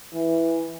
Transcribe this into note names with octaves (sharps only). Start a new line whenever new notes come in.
E3